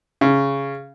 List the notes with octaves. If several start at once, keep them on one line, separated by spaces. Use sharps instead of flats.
C#3